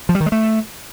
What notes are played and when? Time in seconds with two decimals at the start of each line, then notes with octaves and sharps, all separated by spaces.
0.09 F3
0.15 G3
0.20 D#3
0.26 G#3
0.32 A3